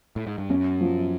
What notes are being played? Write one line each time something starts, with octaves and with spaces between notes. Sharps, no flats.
A2
G#2
G2
F#2 C#4
F3